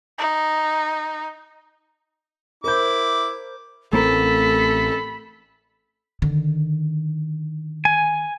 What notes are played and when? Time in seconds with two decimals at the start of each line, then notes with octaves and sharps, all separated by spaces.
0.18 D#4
2.64 E4 A#4 C5 D6 G6
3.93 A1 A3 C4 A4 A#4 B5
6.22 D3 D#3
7.85 G#5